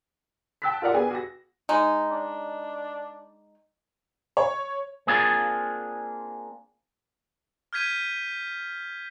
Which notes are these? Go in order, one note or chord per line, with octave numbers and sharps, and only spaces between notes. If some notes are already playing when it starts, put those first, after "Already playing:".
G5 A5 E6 F#6 A6 B6
F4 A#4 D5 F#5
B3 D4 G#4 G5 G#5
F#4 A#6
G#3 D#4
D4
C#5
A#3 C4 D4 F4 G#4
F6 G6 G#6 B6 D#7